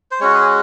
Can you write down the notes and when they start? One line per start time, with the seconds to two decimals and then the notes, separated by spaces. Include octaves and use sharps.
0.11 C5
0.20 G#3 C#4 F#4 C#5
0.34 G#4